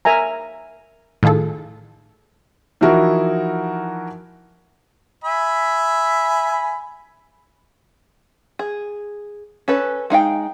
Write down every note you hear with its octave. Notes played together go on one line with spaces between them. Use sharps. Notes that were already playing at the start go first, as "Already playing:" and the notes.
A#4 E5 G#5 A#5
A2 D#3 F4 G#4 A4
E3 F3 D#4 E4 F#4 A#4
E5 G#5 B5
G#4
C#4 A4 B4
G#3 D#4 F5 G5